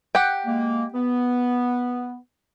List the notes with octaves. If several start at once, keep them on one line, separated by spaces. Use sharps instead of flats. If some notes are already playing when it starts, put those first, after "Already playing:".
G4 F#5 G5
G#3 A#3
B3